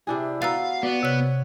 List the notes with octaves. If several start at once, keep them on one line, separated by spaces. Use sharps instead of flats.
C3 D4 E4 G#4
B3 F#4 F5 A#5 E6 A6
B3 F#4 D5
C3 C#5 F#6